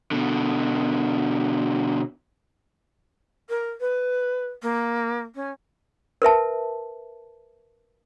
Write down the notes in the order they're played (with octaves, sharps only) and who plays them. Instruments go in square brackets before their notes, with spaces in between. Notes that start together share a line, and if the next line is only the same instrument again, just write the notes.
[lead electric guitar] B2 D3
[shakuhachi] A#4
B4
A#3
C#4
[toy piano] A#4 B4 E5 A5